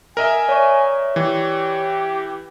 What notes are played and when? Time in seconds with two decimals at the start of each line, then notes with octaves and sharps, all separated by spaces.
0.17 A#4 D#5 E5 G#5
0.49 C#5 D5 C#6
1.16 E3 G4